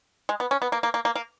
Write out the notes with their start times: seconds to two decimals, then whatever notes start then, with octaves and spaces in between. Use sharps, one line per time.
0.29 G#3
0.40 B3
0.51 C#4
0.62 B3
0.72 A#3
0.83 A#3
0.94 A#3
1.05 A#3
1.15 A#3